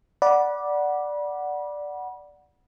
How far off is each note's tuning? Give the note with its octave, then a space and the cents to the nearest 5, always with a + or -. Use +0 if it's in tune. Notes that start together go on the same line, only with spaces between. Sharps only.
D5 +0 F#5 +0 B5 -30